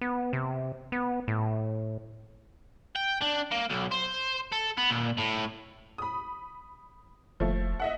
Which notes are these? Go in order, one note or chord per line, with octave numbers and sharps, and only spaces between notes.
B3
C3
B3
A2
G5
D4
A#3
B1
C5
A4
B3
A#2
A2
B5 D#6
F1 F3 A3
D#5 E5 F#5